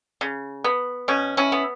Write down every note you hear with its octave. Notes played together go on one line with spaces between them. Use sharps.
C#3
B3
B2 C#4
C#4 E4
B3